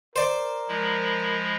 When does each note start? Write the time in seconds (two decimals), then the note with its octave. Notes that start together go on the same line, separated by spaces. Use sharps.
0.16 A#4 C5 D5
0.68 F3 G#3 E4